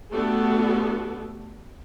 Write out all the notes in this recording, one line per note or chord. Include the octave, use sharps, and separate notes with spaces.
A3 B3 D4 F#4 G4 A4